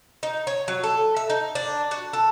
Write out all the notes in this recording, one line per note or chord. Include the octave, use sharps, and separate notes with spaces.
D#4
C#5
F#3
A4
E5
D#4
D4
F#4
A4